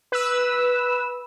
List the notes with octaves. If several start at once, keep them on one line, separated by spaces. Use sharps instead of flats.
B4 E6